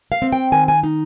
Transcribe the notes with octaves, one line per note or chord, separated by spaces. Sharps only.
F5
C4
G5
D#3 G#5
G#5
D#4